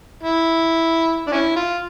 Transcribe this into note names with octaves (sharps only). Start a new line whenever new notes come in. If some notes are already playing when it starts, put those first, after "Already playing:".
E4
D4
C#4 E4
F4